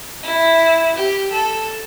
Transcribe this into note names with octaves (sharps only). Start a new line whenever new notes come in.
E4
G4
A4